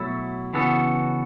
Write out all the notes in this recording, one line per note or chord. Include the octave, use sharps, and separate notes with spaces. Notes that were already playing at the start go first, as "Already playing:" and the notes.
Already playing: B2 F#3 A3 E4
C#3 E3 B3 F#4 A4